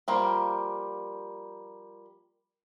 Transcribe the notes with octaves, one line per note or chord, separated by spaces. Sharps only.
F3 G3 A#3